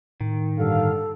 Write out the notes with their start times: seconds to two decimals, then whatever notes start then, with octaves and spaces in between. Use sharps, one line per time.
0.21 A2 D#3
0.58 G2 D3 A4 F5